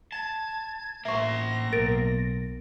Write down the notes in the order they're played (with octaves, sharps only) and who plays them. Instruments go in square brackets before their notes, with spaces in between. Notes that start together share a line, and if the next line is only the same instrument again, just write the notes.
[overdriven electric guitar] A5 [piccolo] G#6
[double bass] A1 A2 [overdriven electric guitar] A#3 C5 [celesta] E5 C#6 [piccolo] A#6
[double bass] B1 [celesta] A#4 A6 D7